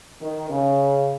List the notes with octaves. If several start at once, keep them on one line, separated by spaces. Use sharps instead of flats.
D#3
C#3